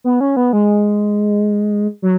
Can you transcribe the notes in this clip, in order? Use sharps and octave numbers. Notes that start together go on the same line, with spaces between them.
B3
C#4
B3
G#3
F#3